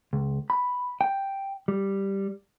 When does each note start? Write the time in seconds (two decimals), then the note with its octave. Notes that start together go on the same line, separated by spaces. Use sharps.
0.13 C#2
0.50 B5
1.01 G5
1.68 G3